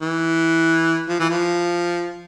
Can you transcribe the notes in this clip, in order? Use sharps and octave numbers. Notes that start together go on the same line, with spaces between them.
E3
F3
E3
F3